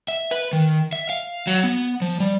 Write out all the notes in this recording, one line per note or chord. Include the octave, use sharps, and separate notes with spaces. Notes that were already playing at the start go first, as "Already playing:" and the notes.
E5
B4
D#3
E5
F5
F#3
B3
F3
G3